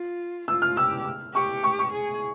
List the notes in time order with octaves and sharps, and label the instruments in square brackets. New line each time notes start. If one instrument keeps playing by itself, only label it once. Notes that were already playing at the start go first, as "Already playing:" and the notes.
Already playing: [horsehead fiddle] F4
[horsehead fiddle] F4 [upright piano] E6
[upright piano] F6
[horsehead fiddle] G4 [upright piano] E6
[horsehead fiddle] G4 [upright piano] C#6
[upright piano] C#6
C#6
[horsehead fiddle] G#4